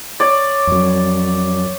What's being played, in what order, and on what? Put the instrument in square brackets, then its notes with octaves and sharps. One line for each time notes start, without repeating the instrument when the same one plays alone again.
[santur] C#5 D5
[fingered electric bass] F2 F#3